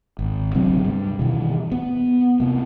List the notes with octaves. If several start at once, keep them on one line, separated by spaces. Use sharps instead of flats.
G#1
D2 C3 F#3 C4
G2
B2 D#3 E3
B3
C3 A#3